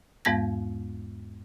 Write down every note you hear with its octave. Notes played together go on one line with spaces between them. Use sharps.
E2 G#2 G#3 B3 G#6 A#6